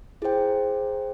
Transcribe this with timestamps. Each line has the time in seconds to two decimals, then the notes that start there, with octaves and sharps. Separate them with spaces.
0.22 E4 G#4 C5 G5